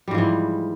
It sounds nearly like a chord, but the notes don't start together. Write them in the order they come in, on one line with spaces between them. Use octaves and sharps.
G3 G#2 F3 E3